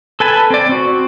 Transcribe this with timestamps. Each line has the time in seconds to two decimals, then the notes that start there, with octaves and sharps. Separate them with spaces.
0.20 A4 B4 G#5 A5 B5
0.50 C4 D5
0.69 C4 F#4